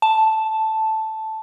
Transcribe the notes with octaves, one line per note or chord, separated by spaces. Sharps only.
A5